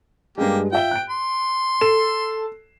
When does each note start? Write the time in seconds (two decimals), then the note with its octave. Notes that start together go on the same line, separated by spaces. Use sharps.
0.38 G2 G3 G#3 A#3 G4
0.72 F4 E5 G5 G7
0.91 F#6 D7
1.10 C6
1.81 A4 C7 E7